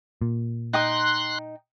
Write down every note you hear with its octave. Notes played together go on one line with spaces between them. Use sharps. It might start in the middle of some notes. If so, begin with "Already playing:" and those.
A#2
D#4 G5 C6 D#6 F#6